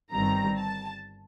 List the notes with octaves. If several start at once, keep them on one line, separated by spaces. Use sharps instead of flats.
G1 G2 D#3 G3 C4 A#5
A5